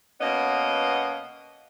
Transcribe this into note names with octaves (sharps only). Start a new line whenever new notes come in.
B2 A#3 B3 C#4 D#5